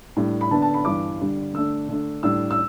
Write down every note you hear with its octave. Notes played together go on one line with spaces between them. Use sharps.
A2 G3 D4
B5
D3 B3 D4 A5
A5
B5
G2 E3 G3 D4 D6
D3 G3 D4
D3 A3 D4 E6
D3 A3 D4
A2 G3 D4 E6
E6